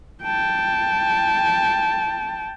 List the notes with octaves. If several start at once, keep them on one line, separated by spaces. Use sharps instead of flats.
G5 A5